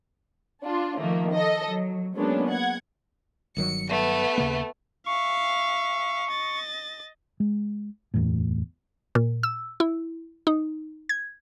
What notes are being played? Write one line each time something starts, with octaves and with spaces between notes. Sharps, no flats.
D4 F4
D#3 F3 A3 A#3
A4 D#5
F#3
F#3 G#3 A#3 B3 C#4 D4
F#5 G#6
G1 D#3 F#3 C#7
A3 B3
D#2 C#3 A#3
E5 F5 C#6
D#5 A6
G#3
F#1 E2 A2
A#2
E6
E4
D#4
G#6